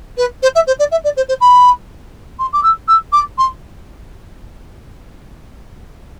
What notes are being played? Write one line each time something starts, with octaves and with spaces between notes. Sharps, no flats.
B4
C5
E5
C5
D5
E5
D5
C5
C5
B5
C6
D6
E6
E6
D6
C6